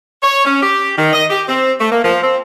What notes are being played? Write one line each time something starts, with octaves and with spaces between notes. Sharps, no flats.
C#5
C#4
G4
D#3
D#5
G4
C4
A3
A#3
F3
C4